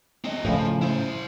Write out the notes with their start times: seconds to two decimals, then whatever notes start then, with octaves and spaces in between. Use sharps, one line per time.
0.24 C4 D#5
0.45 A2 C#3 F3
0.82 E4 C5